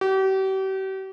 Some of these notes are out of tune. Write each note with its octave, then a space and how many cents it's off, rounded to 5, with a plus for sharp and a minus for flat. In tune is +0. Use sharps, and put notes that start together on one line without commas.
G4 -40